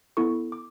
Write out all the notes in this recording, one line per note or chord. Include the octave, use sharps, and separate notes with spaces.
B3 E4 A4 C#6
D6